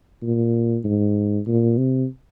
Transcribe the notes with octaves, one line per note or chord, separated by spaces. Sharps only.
A#2
G#2
A#2
C3